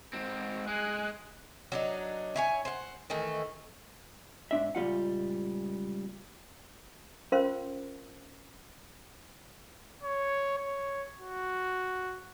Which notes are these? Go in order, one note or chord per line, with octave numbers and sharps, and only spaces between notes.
G#2 C4
G#3 G#5 F#6
F#3 D4 D#4
E4 C#5 G#5
C5 F#5
D#3 E3 A3
G#2 D4 E5
C#2 A#2 G3 F4 F#5
C#4 F4 A#4 C5 F5 C6
C#5
C#5
F#4